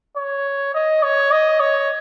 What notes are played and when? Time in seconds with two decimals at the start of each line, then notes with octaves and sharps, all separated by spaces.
0.16 C#5
0.74 D#5
1.03 C#5
1.31 D#5
1.60 C#5